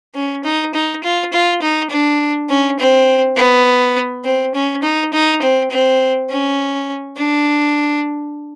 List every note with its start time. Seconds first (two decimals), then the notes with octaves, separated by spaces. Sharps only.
0.15 C#4
0.44 D#4
0.74 D#4
1.04 F4
1.33 F4
1.62 D#4
1.90 D4
2.49 C#4
2.79 C4
3.37 B3
4.24 C4
4.55 C#4
4.83 D#4
5.13 D#4
5.42 C4
5.71 C4
6.30 C#4
7.17 D4